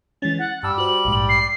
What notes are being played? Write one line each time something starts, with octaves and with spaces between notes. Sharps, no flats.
E3 G#3 C#4 A6
F#5 A6
G2 G3 A5 E6 F6
F#4 C5 F#7
A#1 G#2
C7